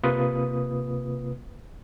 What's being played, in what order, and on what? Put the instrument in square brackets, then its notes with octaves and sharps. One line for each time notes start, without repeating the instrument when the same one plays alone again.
[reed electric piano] C3 A#3 F4 B4 D#6